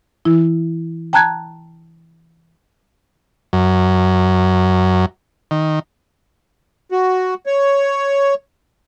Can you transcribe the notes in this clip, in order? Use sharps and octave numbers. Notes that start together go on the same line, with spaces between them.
E3 E4
G5 A5 A#5 F#6 G#6
F#2
D#3
F#4
C#5